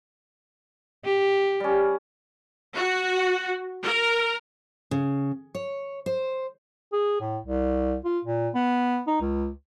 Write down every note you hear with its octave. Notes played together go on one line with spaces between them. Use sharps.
G4
G3 C#4
F#4
A#4
C#3
C#5
C5
G#4
A2
C2
F4
A#2
B3
D#4
C#2